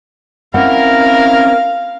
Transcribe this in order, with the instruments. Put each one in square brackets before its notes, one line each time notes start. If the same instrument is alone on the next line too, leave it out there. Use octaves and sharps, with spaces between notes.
[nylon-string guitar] C4 C#4 F#5 [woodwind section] E4 A#4 [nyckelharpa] F5